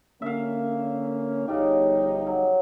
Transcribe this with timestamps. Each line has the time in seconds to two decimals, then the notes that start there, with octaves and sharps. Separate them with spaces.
0.22 D3 A#3 C#4 E5 F5
1.48 G1 C#3 F3 D#4 G4
2.27 F#3